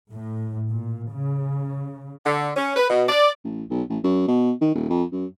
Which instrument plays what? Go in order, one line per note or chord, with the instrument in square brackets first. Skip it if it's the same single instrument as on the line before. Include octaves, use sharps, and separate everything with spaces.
[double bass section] A2
A#2
C#3
[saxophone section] D3
C#4
B4
B2
D5
[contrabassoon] A1
B1
A1
F#2
B2
D#3
D#1
F2
F#2